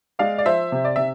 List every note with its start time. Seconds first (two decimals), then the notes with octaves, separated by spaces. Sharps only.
0.19 G#3 D5 F5
0.38 D5
0.45 F3 C5 E5
0.72 C3
0.85 D5
0.96 C3 E5